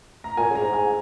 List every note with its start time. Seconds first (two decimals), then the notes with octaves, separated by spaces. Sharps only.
0.24 A#5
0.37 A#2 G#5
0.50 C#3
0.55 A#5
0.61 G#2
0.73 G#5